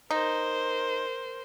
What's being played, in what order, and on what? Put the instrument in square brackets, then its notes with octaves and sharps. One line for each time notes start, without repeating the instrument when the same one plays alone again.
[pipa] D#4 [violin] A#4 C5